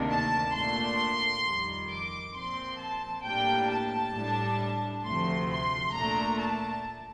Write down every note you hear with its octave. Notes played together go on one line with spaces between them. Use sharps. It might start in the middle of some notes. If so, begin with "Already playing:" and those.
Already playing: D2 C3 D#3 A#3 D4
A5
A#2 A3 D4 C6
F2 D#3 G3
D6
A#2 F3 C4 C6
A5
A2 G3 A#3 D4 G5
A5
A2 G3 D4
D2 C3 F3 A3 C6
C6
A#2 A3 D4 A#5
A5